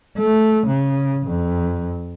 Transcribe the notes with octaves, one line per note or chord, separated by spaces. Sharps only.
A3
C#3
F2